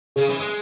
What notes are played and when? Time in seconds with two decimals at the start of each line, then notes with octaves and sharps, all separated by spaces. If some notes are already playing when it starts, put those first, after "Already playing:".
0.16 C#3 G#4 C#5
0.29 E3
0.40 G#3